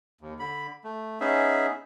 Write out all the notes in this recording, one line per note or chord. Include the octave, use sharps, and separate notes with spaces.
D#2
D3 B5
A3
B3 C#4 D#4 G#4 E5